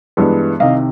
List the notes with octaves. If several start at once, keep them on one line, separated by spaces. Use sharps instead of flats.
G2 E3 G#3 B3
C2 C3 D#3 D#5 F5